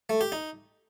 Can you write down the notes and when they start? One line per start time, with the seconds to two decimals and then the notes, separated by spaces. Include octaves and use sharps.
0.09 A3
0.21 G4
0.32 D#4